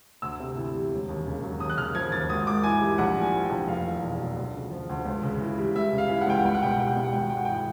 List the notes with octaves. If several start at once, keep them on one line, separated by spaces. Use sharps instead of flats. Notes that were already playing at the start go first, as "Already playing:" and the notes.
D2 E6
C3
E3
G3
E1
D#2
C#3
F#3
D#2 D#6
F#6
C#3 F6
F3 G#6
D#2 A6
G#1 D#6
G#2 D6
E3 G#5
G3
A#1 F#5
A2 G#5
F3
G5
A#1
F1 F5
E2
B2
F#3
D2
C#3
F3
D2
C#2
C#3
E3
G3
C#2 E5
C#3
F5
E3
F#5
C#2 G5
F#5
C2 G5
F#5
B2 G5
F#5
G3 G5
F#5
C2 G5
F#5
G#1 G5
F#5
G#2 G5
F#5
E3 G5
F#5